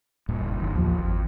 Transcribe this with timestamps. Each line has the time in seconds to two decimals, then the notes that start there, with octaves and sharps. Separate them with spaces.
0.29 D#1 G2 A#2
0.41 F#1
0.60 F#2 D#3
0.75 A1 D#2 F3
0.98 G#1 F2